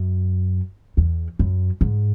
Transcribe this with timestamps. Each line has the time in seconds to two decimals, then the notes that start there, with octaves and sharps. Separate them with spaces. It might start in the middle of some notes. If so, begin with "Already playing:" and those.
Already playing: F#2
0.97 E2
1.39 F#2
1.81 G#2